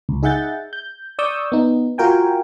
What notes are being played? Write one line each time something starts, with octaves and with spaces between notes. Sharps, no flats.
C#2
D#4 G#4 E5 F#5 G6 A6
G6
D5 C#6 D#6 E6 G6
B3 D#4
F4 F#4 A#4 G5 G#5